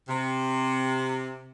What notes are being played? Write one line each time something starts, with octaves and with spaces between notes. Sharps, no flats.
C3